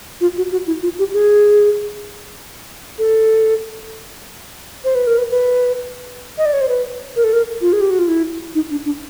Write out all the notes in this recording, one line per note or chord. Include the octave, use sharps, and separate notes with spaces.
F4
F#4
F#4
E4
F4
G4
G#4
A4
C5
B4
A#4
B4
B4
D#5
D5
C#5
C5
B4
A#4
A4
A#4
F4
G#4
G4
F#4
F4
E4
D#4
D4
D4